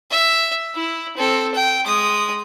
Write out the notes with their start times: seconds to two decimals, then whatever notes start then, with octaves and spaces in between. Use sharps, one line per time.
0.11 E5
0.75 E4
1.17 C4 A4
1.54 G5
1.86 G#3 D#6